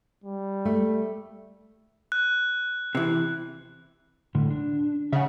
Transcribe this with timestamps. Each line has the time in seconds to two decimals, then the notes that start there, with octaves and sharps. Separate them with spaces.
0.24 G3
0.65 A3
2.12 F#6
2.95 C3 E3
4.35 A2 D3
4.50 D4
5.13 C#3 E5 F#5